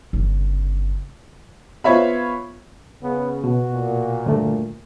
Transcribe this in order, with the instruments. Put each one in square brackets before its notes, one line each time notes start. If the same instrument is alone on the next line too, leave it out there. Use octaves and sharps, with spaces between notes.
[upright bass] G1 C#3
[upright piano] B3 F4 C5 C#5 E5 B5
[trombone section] C#3 [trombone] B3
[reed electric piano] B2 [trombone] F#4
[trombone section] A#2
[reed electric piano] D2 G2 A3